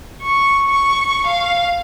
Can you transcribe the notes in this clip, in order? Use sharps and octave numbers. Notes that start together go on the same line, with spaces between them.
C#6
C#6
F5